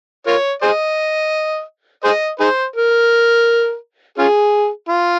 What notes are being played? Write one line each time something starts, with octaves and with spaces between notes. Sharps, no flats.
F4 A#4 C#5
G#4 C5 D#5
G#4 C5 D#5
D#4 G#4 C5
A#4
C#4 F4 G#4
F4